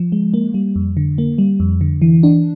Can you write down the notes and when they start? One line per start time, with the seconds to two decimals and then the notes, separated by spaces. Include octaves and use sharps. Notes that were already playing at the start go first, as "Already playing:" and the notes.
Already playing: F3
0.12 G#3
0.34 A#3
0.54 G3
0.76 F2
0.97 D3
1.18 A#3
1.38 G3
1.60 F2
1.81 D3
2.02 E3
2.23 D4